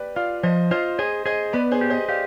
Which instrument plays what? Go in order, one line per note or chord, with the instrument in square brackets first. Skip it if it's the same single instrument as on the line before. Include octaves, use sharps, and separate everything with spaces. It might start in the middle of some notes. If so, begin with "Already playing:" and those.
Already playing: [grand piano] G4 B4 D5
[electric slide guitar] F4 [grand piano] D5 F5
[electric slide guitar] F3 [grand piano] C5 D#5
[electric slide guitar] F4 [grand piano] C5 D#5
[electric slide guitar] G#4 [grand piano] C5 D#5
[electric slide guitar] G#4 [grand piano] C5 D#5
[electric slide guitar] B3 [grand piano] B4 D5
[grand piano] G#4 C5
[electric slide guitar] G4
[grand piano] C5 D#5
[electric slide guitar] G4 [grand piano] D5 F5